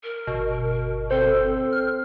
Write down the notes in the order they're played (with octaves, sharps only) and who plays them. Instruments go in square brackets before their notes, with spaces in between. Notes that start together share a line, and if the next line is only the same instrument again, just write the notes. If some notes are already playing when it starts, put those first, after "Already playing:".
[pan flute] A#4
[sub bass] G1 [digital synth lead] B2
[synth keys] C4 C5 [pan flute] A4
[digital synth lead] F6